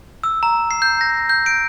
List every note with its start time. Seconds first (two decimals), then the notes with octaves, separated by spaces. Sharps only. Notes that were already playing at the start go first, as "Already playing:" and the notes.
0.24 E6
0.43 A#5
0.71 C7
0.82 G6
1.01 A#6
1.29 G6
1.46 D7